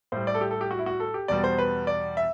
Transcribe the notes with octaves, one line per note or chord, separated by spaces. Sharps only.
A2 G3 C5
D5
A4
G4
A4
G4
F#4
E4
F#4
A4
G4
E2 B2 G3 D5
C5
B4
D5
E5